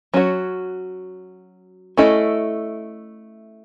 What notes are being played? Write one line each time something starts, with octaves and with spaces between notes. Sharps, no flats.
F#3 C#4 F#4 C#5
A3 C#4 E4 A4 D#5